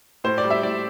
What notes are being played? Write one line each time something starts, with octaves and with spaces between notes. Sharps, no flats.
A2 C5
D5
G3
E5
A2 D5